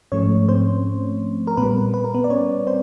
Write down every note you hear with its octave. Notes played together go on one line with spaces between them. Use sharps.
G#2 F3 A3 C#4 C#5
C4 C5
A#4
A#2 G3 B3 B4
B4
A#4
B3 B4
D5
C#4 C#5
C4 C5